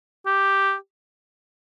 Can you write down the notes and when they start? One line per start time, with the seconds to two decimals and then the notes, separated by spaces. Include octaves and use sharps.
0.26 G4